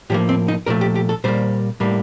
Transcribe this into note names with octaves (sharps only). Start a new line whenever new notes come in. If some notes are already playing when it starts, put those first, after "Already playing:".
A2 F3 A#3 G4
C4
D#4
A#2 F3 A3 A#4
G4
G4
A4
A#2 G3 A#3 C5
A2 G3 A#3